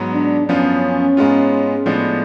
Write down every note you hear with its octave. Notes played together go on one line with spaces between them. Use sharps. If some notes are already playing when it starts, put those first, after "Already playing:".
Already playing: G#2 F#3 B3
D4
F#2 F3 B3 C#4 F4
G#2 G#3 B3 F4
A2 F3 G#3 B3 D4